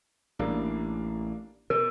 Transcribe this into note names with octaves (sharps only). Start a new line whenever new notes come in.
A1 G3 A#3 D4
B2 A#4